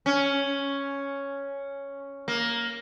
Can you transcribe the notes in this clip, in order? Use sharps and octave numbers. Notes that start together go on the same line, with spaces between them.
C#4
A#3